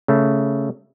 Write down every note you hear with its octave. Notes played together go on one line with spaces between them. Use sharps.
C#3 A3